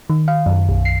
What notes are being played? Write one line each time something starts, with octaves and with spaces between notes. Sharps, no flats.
D#3
F5
F#2
B1
C7